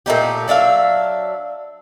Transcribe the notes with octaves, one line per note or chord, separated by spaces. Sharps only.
A#2 A3 D#4 G4
F#3 D4 E5 F5